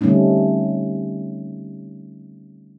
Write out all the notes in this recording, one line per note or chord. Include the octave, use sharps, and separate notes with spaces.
D3 G3 A3 C4 C#4 D#4